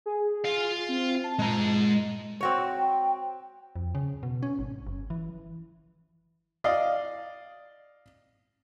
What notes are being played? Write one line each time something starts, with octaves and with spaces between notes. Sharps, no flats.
G#4
F4 F5
C4
A5
A#2 G#3 A#5
C4 F#4 C#5
G5
F2
C#3
B2
C#4
G#1
F#1
E3
D5 D#5 F5